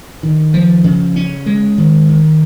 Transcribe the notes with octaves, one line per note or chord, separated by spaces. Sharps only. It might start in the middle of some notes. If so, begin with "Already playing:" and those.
D#3
F3
C#3
C#4
G#3
D#3
D#3